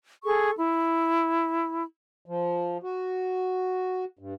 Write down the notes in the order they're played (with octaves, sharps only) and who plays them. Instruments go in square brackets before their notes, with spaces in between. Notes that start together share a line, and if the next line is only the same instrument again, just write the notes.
[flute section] G#4 A4 C#6
E4
[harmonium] F3
F#4
G2